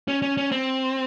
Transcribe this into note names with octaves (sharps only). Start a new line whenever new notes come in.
C#4
C#4
C#4
C4